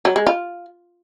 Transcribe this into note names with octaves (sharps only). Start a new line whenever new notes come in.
F#3
G#3
F4